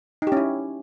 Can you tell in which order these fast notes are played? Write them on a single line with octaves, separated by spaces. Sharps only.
D#4 G4 C#4 E4